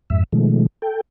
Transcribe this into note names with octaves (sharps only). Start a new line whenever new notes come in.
F2 G#2 E5
B2 D#3 F3 G#3 A3
A4 G5